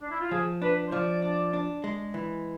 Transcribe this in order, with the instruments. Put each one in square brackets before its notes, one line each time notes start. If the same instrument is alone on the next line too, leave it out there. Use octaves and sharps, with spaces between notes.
[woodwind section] D4
E4
F4
[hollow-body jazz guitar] F3 [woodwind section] G#4
[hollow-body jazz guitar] D4 [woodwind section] B4
[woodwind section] C5
[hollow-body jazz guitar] F3 [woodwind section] D5
[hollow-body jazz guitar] D4
D4
G#3
E3